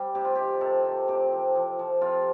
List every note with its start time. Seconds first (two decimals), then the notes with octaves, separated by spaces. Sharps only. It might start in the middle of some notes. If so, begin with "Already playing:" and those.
Already playing: G3 C4
0.15 C3 G4
0.25 F4
0.35 D#3 G4
0.61 C3 A4
0.85 D#3
1.08 C3 G4
1.32 F3
1.56 F3
1.79 F3
2.01 C3 F4